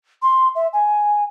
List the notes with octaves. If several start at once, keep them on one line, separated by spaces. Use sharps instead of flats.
C6
E5
G#5